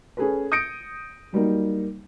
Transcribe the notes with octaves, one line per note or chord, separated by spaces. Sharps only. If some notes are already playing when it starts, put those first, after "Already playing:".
C#4 G#4 A4 B4
D#6 G6 A#6 C#7 D7
F#3 G3 A#3 D#4